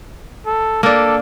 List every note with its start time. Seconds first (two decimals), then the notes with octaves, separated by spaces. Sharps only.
0.46 A4
0.83 A#3 D4 A4